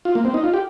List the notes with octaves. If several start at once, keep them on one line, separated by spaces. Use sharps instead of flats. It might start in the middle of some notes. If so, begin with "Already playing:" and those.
F4
A#3
C4
D#4
F4
G4